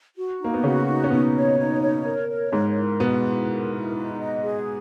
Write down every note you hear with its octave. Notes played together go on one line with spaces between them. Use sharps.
F#4
A#3 D#4
B3
C#3 C#4 F#4
D#4
C#4
B2 B3 D#4
C#5
D#4
C#5
A#4
C#5
G#2 G#3 A#4
E4
B2 B3 E4
E4
A#4
E4
D#4
D#5
G#4